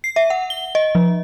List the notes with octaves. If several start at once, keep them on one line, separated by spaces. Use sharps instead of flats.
C7
E5
F#5
G7
D#5
F3